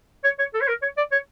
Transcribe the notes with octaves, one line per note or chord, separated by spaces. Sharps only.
C#5
C#5
A4
C#5
A#4
C#5
D5
C#5